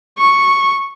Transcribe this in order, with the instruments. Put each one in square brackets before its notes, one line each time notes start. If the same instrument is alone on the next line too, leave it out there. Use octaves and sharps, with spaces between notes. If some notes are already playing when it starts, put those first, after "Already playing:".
[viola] C#6